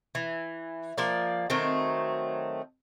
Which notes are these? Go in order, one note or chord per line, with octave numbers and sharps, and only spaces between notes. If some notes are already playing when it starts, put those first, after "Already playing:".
E3
F3 A#3 D5
D#3 F#3 A3 C4